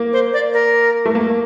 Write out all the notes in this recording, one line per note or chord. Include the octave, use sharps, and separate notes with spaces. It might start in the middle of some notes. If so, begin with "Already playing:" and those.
Already playing: A#3
C5
D5
A#4
A3
A#3